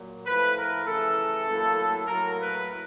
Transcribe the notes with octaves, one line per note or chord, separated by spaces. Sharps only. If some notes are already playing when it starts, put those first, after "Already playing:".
Already playing: A#2 F#3
A2 F3 A3 B4
A#4
C#3 E3 A3 A4
A2 F#3 A#3
A2 F#3 A#3 A#4
B4